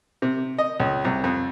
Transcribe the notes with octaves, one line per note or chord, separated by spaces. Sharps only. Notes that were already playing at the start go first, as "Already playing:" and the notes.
C3
D#5
C#2
C2
F2